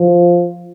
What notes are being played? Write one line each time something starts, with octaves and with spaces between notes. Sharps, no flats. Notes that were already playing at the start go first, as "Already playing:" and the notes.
Already playing: F3